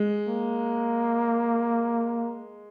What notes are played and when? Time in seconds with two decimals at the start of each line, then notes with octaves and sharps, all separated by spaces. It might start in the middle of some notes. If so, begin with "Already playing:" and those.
Already playing: G#3
0.28 A#3